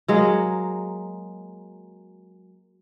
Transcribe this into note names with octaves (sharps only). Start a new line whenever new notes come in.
F#3 G#3 A#3